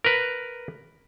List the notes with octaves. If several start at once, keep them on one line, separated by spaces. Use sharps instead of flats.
A#4 B4